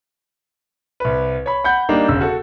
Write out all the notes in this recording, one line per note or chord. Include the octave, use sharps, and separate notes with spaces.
C2 B4
C#5 B5
F#5 B5 G6
G3 A#3 D4 D#4
E1 C#3 E6
F#4 A4